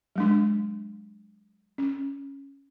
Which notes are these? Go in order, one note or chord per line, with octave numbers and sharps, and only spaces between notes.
F#3 G#3 D4
C#4